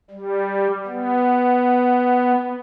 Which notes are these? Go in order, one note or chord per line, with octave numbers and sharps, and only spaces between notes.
G3
B3